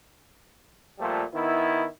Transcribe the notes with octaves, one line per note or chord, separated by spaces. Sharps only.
A#2 F3 G3 A3
D#3 B3 E4